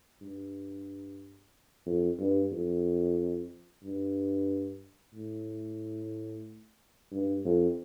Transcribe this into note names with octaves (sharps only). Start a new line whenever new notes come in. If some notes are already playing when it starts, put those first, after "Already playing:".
G2
F2
G2
F2
G2
A2
G2
F2